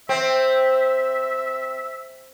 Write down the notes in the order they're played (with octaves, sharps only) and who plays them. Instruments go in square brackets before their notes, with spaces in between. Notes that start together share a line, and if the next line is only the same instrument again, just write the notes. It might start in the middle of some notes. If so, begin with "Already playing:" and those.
[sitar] C4 [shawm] E5